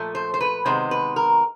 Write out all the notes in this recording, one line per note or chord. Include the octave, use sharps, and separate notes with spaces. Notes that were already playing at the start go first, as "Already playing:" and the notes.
Already playing: A#2 F3 A3
C5
C5
B4
C3 D#3 G#3 B3 C5
B4
A#4